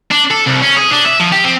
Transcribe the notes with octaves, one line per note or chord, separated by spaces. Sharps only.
D4
A4
C2
C#4
G#4
D4
E5
F3
G4
C4